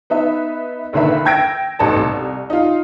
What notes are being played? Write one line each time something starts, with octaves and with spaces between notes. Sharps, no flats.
B3 D#4 E5
A#1 D3 D#3 B4 E5
G5 E6 G#6 A#6 D7
A1 B2 A3 B3 D#4 A5
C2
D#4 F4